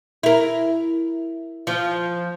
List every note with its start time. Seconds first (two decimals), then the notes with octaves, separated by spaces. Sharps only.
0.23 E4 A#4
1.67 F3